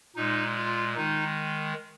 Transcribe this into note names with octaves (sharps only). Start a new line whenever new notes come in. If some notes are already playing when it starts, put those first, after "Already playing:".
A#2 G#3 D#4
F4
D#3 G#3 D#4